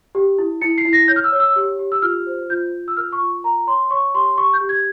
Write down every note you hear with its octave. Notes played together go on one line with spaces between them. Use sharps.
G4
E4
E4 C#7
C7
E4
A#6
C#5 G6
F6
E6
C#5
E6
G4
G4
E6
F4 F6
C5
F4 G6
F4
E6
A#4 F6
C#6
F4
A#4 A#5
C#5 C6
C#5 C#6
G4 C6
G4 C#6
G6
G4
G#6